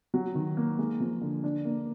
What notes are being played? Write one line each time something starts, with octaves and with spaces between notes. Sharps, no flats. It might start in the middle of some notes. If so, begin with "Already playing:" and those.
F#3
D#3
A#3
G#3
F3
D3
D4
A#3